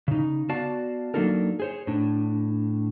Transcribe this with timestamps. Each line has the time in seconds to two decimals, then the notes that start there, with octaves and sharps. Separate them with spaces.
0.08 C#3 D#4
0.49 B3 F#4 D5 F5 A5
1.14 F#3 A#3 D4 D#4 A4 A#4
1.60 G#4 C5 C#5
1.87 A2 D4